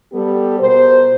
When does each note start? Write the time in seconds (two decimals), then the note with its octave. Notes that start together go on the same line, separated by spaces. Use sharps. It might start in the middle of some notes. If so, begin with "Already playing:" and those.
0.13 G3 B3 G4 A4
0.60 B2 A#4 C5